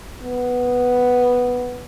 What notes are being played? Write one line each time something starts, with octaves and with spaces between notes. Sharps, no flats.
B3